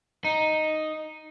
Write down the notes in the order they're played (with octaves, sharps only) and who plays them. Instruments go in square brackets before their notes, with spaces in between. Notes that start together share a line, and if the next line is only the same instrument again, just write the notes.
[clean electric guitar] D#4